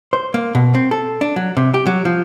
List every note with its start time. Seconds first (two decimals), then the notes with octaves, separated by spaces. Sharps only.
0.13 C5
0.34 A#3
0.55 B2
0.75 C4
0.91 A4
1.21 D4
1.36 F#3
1.57 C3
1.74 G4
1.86 F#3
2.05 F3